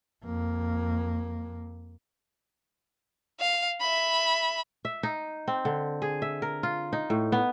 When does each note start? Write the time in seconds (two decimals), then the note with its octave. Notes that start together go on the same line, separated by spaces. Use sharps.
0.24 F2 A#3
3.40 F5
3.81 E5 B5
4.85 E5
5.03 D#4
5.48 C4
5.65 D3
6.02 G#4
6.22 E5
6.42 A#4
6.63 F4
6.93 D#4
7.10 A2
7.32 B3